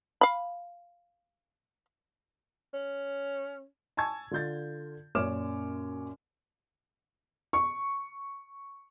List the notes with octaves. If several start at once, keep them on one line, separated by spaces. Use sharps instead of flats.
F5 B5
C#4
G#5 A5 C#6 E6 G#6
D3 F4 G6 A6
F#2 A#2 C#5 D6 F6 E7
C#6